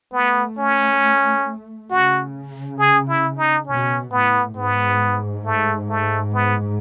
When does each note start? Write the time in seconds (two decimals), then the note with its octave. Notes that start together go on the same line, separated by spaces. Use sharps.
0.12 A3 B3
0.58 C#4
1.90 C#3 F#4
2.79 G#4
3.09 E4
3.38 D#4
3.68 B2 C#4
4.12 A2 B3
4.57 G#2 B3
5.45 A3
5.90 A3
6.34 B3